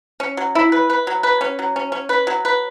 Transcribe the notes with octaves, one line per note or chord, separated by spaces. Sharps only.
C#4
F#3
E4
B4
B4
F#3
B4
C#4
F#3
C#4
C#4
B4
F#3
B4